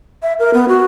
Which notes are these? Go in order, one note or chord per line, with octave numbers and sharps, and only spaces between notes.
E5
A#4
B3
F#4